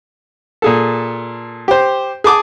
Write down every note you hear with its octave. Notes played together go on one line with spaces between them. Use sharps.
A#2 G#4 A4
G4 C5
G#4 A5 D6 D#6